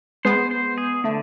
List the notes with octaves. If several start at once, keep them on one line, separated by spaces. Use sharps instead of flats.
G#3 B3 C5
C5
G#4
D3 A3